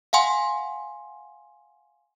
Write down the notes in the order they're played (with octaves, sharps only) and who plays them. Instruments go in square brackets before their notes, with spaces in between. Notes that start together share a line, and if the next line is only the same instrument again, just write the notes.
[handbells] F5 F#5 G#5 C6